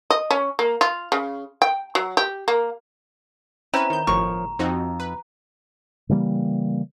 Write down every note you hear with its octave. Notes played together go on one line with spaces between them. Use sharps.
D#5
C#4
A#3
F4
C#3
G5
F#3
G4
A#3
C4 C#4 E4 B4 A#5
D#3 G6
G1 A2 F3 A#4 C#5 C#6
F2 C4 D#4 F#4
B4
C#3 E3 G3 A#3